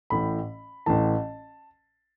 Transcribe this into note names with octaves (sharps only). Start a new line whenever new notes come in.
A1 A2 E3 B5
A1 A2 E3 A5